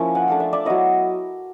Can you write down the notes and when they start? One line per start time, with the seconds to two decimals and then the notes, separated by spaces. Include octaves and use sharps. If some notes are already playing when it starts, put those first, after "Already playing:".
Already playing: F3 A#3 C#4 E4
0.15 F#5 G#5
0.28 A3 D4 F4
0.40 D5 E5
0.53 D5 E5
0.65 F#3 B3 E4 C#5 D#5